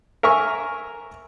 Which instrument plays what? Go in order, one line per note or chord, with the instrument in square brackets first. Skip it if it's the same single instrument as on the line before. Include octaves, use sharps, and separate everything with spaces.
[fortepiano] A#4 E5 G#5 C#6